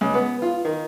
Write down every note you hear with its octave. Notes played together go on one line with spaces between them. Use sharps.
C#2
B3
F4
D#3